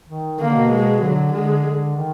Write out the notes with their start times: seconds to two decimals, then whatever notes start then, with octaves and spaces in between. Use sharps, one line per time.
0.09 D#3
0.39 D3 A#3
0.54 B2
0.71 G#3
1.02 D3 F#3
1.32 D3 G#3
1.64 D3
1.96 D#3